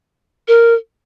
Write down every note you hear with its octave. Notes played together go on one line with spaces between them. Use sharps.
A#4